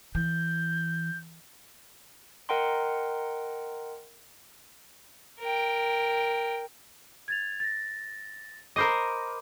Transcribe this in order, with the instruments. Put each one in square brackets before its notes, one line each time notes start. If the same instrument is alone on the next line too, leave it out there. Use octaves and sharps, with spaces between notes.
[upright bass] E3 [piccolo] G6
[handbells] A#4 D#5 F#5 G5 A#5 C6
[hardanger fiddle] A#4 G5
[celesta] G#6 A6 F7
A6 A#6
[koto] A#4 C5 D#5 [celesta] B5 D6